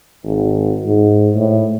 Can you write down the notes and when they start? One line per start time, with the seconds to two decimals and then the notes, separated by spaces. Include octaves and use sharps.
0.24 G#1
0.86 G#2
1.35 A2